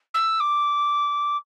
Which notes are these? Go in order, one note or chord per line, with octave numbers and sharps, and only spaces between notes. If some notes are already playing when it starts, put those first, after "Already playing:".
E6
D6